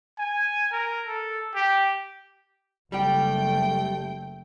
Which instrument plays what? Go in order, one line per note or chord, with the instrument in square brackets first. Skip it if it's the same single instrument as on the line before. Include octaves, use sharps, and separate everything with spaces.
[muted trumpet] G#5
A#4
A4
G4
[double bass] F#1 A3 [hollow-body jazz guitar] G3 G4 [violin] G5